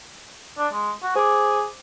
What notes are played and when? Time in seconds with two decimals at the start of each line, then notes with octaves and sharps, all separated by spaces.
0.58 D4
0.73 G#3
1.03 F#4
1.16 G#4 C5 D6